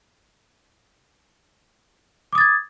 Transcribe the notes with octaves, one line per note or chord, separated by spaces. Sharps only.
D6 D#6 G#6 A6